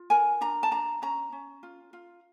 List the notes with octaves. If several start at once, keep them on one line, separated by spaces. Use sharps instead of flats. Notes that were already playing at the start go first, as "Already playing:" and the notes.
Already playing: F4
A#4 G#5
D4 A#5
A5
D4 A#5
C#4 A#5
C#4
F4
F4